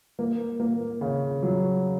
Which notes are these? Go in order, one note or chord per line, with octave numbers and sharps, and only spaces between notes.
A#3
A#3
C#3
F#3